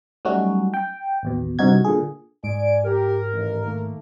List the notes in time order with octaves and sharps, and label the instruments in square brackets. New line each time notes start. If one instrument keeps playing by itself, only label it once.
[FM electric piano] F#3 G3 A3 C#4 D#4 F#4
G5
A1 D#2 B2
C2 G2 C3 D#4 F#4 G#6
A#2 D3 G#4
[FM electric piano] G#2 [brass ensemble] D5 G#5 [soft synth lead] D7
[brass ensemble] G4 [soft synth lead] A#4
[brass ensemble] A1 D#2
D#3 A3 A#3